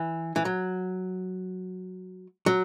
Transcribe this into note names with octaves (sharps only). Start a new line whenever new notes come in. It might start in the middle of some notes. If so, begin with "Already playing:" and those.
Already playing: E3
E3
F#3
F#3